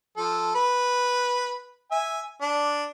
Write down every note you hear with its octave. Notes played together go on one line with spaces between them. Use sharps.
F3 A4
B4
E5 G#5
D4